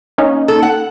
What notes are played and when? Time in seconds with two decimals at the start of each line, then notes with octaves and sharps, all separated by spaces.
0.18 A#3 C#4 D#4
0.48 A4
0.63 F#5